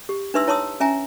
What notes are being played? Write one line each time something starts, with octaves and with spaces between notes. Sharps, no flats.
G4
D4 D#4 B4 E5 C6 E6
E4 C#5 A5 C6 D#6 E6
C#4 E5 G#5 A#5